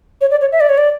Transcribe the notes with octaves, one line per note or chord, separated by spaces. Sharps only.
C#5
D5
C#5
E5
D5
C#5
D5